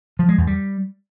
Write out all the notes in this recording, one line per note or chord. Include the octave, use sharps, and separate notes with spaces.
F3
G#3
E2
G3